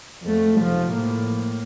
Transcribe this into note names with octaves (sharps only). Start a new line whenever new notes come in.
F2 A3
F1 F3
A2 A#3